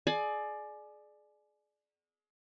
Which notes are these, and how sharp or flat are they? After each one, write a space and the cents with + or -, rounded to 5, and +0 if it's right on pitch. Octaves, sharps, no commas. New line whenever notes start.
G#4 +30 D5 +20 G#5 +30